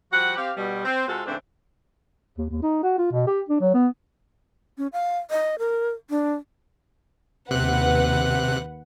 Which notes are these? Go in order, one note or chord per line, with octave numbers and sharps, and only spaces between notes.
F3 G3 F#4 F#5
C4 G4 F5
B2 G3
C4
C3 G#3 C4 F4 F#4 A4
G#2 C#3 E3 A3 C4 D4
D#2
D#2
D#4
F#4
F4
B2
G4
D4
F#3
B3
C#4
F5
D#5
A#4
D4
D#2 C3 B4 F#5 F#6